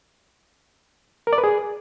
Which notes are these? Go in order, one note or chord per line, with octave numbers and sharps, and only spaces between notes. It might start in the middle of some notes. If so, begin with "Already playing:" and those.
A#4
D5
B4
G#4